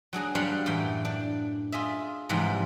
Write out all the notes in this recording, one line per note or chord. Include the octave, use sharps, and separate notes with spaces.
F#3 D4 G#4 A#5
G3 D4 C#5 F5 F#5 C6
F#2 A2 E3 G5
D4
F4 G#4 D#5 E5
G#2 C3 E3 F3 G3